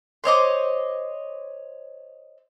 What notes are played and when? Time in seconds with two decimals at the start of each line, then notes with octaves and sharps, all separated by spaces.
0.24 C5 C#5 D#5 D6